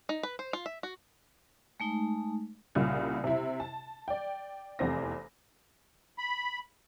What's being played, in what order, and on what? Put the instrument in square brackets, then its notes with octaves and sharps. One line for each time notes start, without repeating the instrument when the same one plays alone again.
[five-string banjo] D#4
B4
C5
F4
E5
F#4
[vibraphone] G#3 A3 D#4
[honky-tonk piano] C2 A#2 C#3
C3 E4
A5
D5 G5
F1 E2 C4 A#6
[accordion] B5